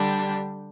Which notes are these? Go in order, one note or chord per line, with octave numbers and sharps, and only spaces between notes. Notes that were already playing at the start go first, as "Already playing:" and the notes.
Already playing: D3 G3 D4 G4